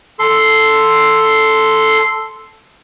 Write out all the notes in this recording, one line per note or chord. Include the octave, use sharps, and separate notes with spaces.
A4 C6